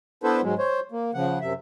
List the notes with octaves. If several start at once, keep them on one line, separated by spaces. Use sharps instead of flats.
B3 D4 E4 A4 B4 C5
G#2 F#3 G#3
C5 C#5
A#3
C#3 F3 F#5
F#2 C3 E5